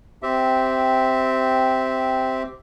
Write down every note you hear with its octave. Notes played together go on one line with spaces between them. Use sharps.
C4 G4 E5